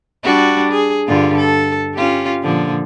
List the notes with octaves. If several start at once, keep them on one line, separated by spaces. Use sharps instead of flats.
G3 D4 F#4
G#4
G2 D3 F4
A4
C#4 F4 G4
A#2 D3 F3